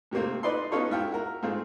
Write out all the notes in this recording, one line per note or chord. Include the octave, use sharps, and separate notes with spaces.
G#2 C3 A3 A#3 C4
D#4 B4 D5 D#5 C6
B3 C#4 D#4 F4 A4 C#5
G#2 E4 F4 G5
F#4 A#4
G#2 A3 C4 F4 G#4